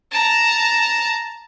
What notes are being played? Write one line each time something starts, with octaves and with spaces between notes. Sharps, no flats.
A5 A#5